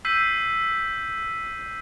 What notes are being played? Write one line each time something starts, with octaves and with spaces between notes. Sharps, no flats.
E6 G6 B6 C7 D#7